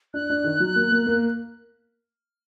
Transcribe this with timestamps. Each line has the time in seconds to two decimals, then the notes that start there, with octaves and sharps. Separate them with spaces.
0.14 D4 F#6
0.30 D4
0.44 D#3
0.60 F#3
0.76 A#3
0.92 A#3
1.06 A#3